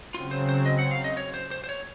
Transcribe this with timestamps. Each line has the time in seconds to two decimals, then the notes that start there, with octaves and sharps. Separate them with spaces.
0.14 C#3 F#3 C4 F4
0.31 C5
0.49 C5
0.66 D#5
0.79 F#5
0.91 F5
1.04 D#5
1.17 C#5
1.34 C5
1.51 C5
1.64 C5
1.69 C#5